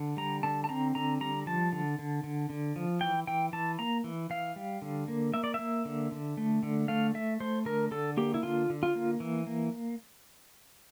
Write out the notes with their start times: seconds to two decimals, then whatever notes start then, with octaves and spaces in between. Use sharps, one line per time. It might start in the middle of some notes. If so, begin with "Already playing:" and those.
Already playing: D3
0.17 G3 A#5
0.43 D3 A5
0.64 A5
0.69 C4 A#5
0.95 D3 A#5
1.20 G3 A#5
1.46 F3 A5
1.72 D3
1.99 D3
2.23 D3
2.50 D3
2.76 F3
3.01 E3 G5
3.27 E3 G5
3.53 E3 A5
3.79 A#3 A#5
4.04 E3
4.30 E3 F5
4.56 G3
4.82 D3
5.08 A#3
5.34 A#3 E5
5.44 D5
5.54 A#3 E5
5.85 D3
6.12 D3
6.37 A3
6.63 D3
6.88 A3 F5
7.14 A3 E5
7.40 A3 C5
7.65 D3 A#4
7.91 D3 A4
8.17 A#3 G4
8.34 E4
8.43 D3 F4
8.70 D3
8.83 F4
8.95 A#3
9.20 E3
9.47 A#3